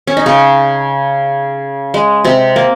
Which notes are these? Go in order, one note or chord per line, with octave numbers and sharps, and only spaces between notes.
C#4
D#4
C#3 C#4
G#3
C3 C4
A#3